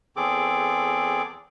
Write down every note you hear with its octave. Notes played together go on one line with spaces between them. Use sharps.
E2 C4 G#4 A4 D6